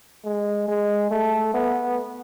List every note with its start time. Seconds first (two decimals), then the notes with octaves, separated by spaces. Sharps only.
0.24 G#3
0.68 G#3
1.11 A3
1.54 B3